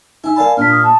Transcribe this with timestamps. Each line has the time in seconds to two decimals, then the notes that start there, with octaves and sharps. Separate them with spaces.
0.24 D#4 E4 G#5 E6
0.36 A#4 D5 F5 G#5 A5 B5
0.57 A#2 D4 A5 F6 B6
0.70 D#6
0.83 A5